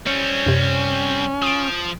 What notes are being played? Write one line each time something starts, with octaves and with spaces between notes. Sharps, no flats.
G3 C4 C#4 C#7
F#2 C3
F3 D#6 D7